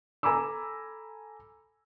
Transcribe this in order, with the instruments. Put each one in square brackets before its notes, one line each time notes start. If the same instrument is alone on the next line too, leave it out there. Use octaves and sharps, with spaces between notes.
[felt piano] A4 G#5 A#5 B5 D6 E6